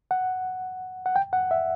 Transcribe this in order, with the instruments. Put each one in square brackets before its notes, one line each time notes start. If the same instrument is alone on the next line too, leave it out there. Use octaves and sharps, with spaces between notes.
[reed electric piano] F#5
F#5
G5
F#5
E5